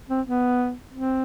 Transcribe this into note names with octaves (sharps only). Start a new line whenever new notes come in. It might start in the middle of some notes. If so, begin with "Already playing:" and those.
C4
B3
C4